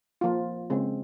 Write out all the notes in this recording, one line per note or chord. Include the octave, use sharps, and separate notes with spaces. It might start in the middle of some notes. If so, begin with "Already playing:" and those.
F3 A#3 F4
C#3 G#3 C4